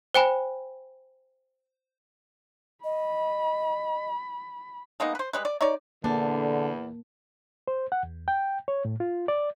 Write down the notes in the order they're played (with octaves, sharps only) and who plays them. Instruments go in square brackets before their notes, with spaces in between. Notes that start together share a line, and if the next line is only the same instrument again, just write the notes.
[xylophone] C5 G5 G#5 B5
[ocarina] D#5 [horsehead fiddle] B5
[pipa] G#3 A#3 B3 D#4
B4 C5
G3 G#3 B4
D5
D#4 C#5 D5
[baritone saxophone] E2 [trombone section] D3 [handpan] A#3 [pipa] D4
[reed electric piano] C5
F#5
E2
G5
C#5
A2
F4
D5